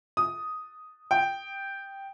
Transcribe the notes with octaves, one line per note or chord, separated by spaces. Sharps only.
D#6
G5